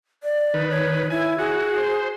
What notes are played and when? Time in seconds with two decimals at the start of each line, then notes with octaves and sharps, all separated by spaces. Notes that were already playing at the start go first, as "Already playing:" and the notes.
0.23 D5
0.54 D#3 B4
0.70 C#5
1.10 E4 G#5
1.39 F#4 G#4
1.77 C5